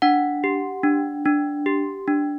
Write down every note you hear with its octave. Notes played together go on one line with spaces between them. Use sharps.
D4 F#5
G4
D4
D4
G4
D4